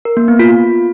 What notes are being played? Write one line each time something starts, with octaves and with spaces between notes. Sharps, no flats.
A#4
A#3
B3
F4
F4